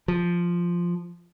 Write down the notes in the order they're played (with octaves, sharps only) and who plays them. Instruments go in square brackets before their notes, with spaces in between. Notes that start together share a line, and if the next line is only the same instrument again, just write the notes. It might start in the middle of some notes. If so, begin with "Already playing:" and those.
[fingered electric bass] F3